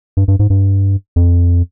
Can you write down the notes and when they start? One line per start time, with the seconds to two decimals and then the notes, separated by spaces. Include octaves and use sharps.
0.17 G2
0.28 G2
0.39 G#2
0.50 G2
1.16 F2